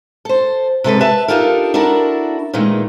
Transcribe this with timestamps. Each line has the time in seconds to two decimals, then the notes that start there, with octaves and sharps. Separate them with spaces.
0.25 A4 C5
0.84 C3 G#3 A4 B4
1.00 B4 E5 A5
1.28 D4 D#4 F4 G4 A4 A#4
1.74 D4 E4 F#4 A4 A#4
2.53 A#2 D#3 E3 G#3 A3